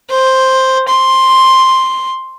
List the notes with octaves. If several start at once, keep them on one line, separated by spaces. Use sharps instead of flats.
C5
C6